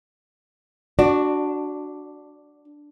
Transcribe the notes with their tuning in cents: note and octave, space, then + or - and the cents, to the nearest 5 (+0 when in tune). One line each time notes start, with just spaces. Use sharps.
D4 +0 F#4 +0 D5 +30